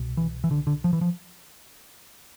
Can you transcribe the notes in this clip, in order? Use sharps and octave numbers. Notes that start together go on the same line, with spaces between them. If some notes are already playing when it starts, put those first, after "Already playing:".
Already playing: C2 B2
E3
E3
D3
D3
F3
E3
F3